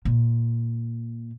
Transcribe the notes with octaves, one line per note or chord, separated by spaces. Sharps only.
A#2